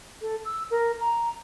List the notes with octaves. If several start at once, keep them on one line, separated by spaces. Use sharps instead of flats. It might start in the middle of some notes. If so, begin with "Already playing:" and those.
A4
E6
A#4
A#5